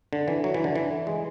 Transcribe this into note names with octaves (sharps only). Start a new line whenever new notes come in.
D3
E3
F#3
E3
D3
E3
G#3